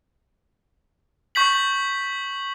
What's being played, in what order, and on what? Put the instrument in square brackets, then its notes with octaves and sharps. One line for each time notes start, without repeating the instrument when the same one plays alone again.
[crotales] C#6 G6 B6 F#7